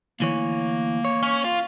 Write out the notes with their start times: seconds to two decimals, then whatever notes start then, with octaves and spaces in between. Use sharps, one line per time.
0.20 D2 E3 A#3 C#5
1.05 C#5
1.23 C#4
1.44 F4